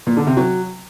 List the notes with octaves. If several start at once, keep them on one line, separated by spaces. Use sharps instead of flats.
A#2
D3
C3
F#3